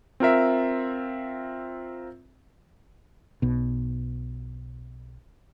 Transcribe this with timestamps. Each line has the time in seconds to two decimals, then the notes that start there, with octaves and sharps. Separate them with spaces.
0.20 C4 F4 A#4 E5
3.42 B1 B2